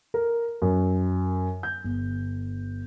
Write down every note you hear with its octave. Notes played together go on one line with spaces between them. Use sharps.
A#4
F#2
G6
G1